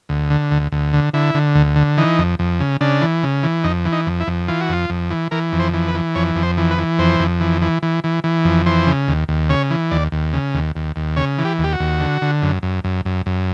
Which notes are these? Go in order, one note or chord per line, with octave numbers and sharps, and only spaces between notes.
D2
D3
D2
D2
D3
D3 E4
D3
D2
D3
E3 D#4
F2
F2
C#3
C#3 D4
E3
C#3
E3
F2 D#4
E3
D#4
F2
E4
F2
E3 F4
F#4
F2 F4
F2
E3
E3 A#4
F2
C5
E3
B4
E3
F2 C#5
F2
C5
E3
B4
E3
F2 C5
F2
E3
E3
E3
E3
E3
F2
E3 C5
C#3
D#2
D#2
C#3 C#5
E3
D#2 D5
D#2
C#3
D#2
D#2
D#2
C#3 C#5
E3
G4
D#2
G4
F#4
D#2
D3
D3
F#2
F#2
F#2
F#2
F#2